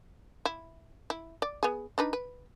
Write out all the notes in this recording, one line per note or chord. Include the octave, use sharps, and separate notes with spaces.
E4
E4
D5
B3 G#4
D4 D#4 B4
B4